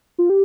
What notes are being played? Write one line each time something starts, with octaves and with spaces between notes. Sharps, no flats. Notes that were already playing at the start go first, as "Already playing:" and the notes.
F4
G4